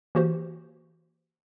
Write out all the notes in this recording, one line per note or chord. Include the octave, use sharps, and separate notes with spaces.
E3 A#3 F#4 G4 C5